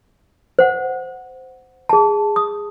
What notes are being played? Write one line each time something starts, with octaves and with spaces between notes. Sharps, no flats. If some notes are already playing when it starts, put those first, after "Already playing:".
C5 F#5
G#4 A5
D#6